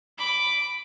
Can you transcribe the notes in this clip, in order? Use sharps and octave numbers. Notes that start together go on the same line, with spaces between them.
B5 D6